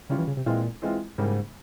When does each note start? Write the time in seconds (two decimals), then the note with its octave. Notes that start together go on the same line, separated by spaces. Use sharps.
0.09 C#3 G3 C#4 F4
0.18 E3
0.27 C#3
0.37 C3
0.46 A#2 E3 G#3 C4 F4
0.82 E3 G#3 C4 F4
1.18 G#2 C#3 G3 A#3